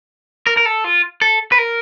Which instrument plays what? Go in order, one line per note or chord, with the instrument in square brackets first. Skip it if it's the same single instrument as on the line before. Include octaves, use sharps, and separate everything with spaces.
[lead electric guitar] A#4
A#4
A4
F4
A4
B4
A#4